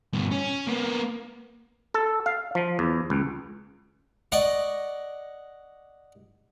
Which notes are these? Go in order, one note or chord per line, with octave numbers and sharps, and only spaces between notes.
G2 B2
C#4
A#3 B3
A4
F5
F3
E2
C#2
D5 D#5 F#5 C#6